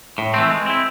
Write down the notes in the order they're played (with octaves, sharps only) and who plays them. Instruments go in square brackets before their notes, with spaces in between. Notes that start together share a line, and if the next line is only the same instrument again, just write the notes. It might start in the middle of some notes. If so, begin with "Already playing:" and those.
[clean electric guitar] A2
E3 A3 C4
G#3
C4 E4